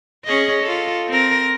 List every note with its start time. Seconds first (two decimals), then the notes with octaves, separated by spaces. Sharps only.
0.25 C#4 G#4 D#5
0.63 F4 A4
1.08 C4 A#4